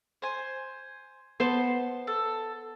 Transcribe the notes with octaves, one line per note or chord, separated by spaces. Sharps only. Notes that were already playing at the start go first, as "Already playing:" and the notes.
C5 G#5
B3 C5 A5 C6
A4